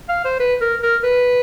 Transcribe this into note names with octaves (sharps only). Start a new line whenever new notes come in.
F5
C5
B4
A#4
A#4
B4